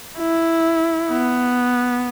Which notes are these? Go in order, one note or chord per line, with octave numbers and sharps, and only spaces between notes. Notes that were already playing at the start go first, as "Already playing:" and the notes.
E4
B3